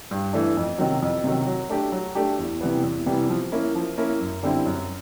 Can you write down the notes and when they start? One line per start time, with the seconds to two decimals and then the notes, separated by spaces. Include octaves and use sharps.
0.11 G2
0.33 E3 A3 D4
0.57 F2
0.78 C3 D#3 F#3
1.02 F2
1.24 C3 D#3 F#3
1.47 F#3
1.70 A3 D4 G4
1.92 F#3
2.15 A3 D4 G4
2.39 E2
2.61 C3 E3 G3 B3
2.84 E2
3.06 C3 E3 G3 B3
3.30 F3
3.52 A#3 C#4 E4
3.75 F3
3.98 A#3 C#4 E4
4.21 F#2
4.43 D3 G3 C4 E4
4.66 F#2